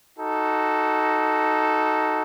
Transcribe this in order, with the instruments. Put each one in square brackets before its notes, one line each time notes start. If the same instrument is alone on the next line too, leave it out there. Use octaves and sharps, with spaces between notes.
[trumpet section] D#4 F#4 A4